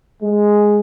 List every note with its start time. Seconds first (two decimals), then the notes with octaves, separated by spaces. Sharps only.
0.22 G#3